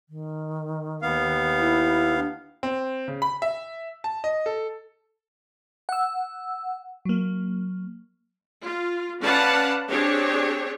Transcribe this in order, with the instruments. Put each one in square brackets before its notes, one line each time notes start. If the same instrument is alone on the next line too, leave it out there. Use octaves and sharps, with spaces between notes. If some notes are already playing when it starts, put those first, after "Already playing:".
[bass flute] D#3
[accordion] D#2 B3 F5
[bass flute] E4
D4
[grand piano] C4
C#3
B5
E5
A5
D#5
A4
[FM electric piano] F#5 E6
F#3 A#3
[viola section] F4
C#4 B4 D5 F5 F#5 A5
C4 D4 G4 G#4 C#5